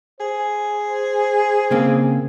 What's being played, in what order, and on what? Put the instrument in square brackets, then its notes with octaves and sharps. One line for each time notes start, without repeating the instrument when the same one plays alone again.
[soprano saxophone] G#4 [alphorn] C5
[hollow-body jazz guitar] C#3 A#3 C4